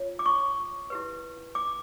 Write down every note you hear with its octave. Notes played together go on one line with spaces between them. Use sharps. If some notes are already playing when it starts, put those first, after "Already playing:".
Already playing: F4 C#5
D6
C#6
E4 G4 B4
D6